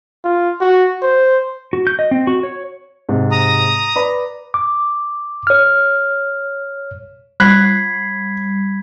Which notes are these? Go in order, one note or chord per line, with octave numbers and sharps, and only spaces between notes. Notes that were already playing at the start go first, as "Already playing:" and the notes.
F4
F#4
C5
F#4
G6
D#5
C4
F#4
C#5
G#2 C3
A#5 D#6
B4 D5 B5
D6
C#5 F6
G3 B5 F#6 G#6 B6 C7